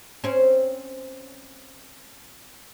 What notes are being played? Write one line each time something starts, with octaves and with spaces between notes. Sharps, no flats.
C4 C#4